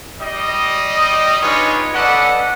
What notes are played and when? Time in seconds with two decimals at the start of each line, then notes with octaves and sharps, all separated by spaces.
0.20 G3 D#5 D#6
1.41 D4 D#4 F4 G#4 B4 C#5
1.93 C#4 A4 B4 D5 D#5 F#5